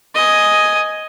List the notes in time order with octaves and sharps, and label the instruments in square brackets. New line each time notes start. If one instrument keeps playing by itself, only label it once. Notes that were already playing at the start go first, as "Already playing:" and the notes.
[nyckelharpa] D#5 G#5